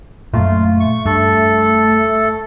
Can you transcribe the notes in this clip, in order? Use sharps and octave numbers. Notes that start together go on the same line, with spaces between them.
F#2 A#2 A3 F4
C#6
G2 A4